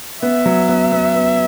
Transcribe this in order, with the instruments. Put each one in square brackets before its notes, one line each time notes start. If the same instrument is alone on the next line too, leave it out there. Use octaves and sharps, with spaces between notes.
[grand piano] B3 [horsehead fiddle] E5
[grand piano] F#3
B3
B3
B3